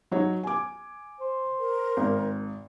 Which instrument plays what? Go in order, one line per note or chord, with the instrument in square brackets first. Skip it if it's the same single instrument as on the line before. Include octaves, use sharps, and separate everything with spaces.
[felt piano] F#3 D#4 C#5
G#5 D6
[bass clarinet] C5
[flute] A#4
[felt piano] G#1